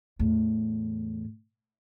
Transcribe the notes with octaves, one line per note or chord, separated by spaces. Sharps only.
E2 A2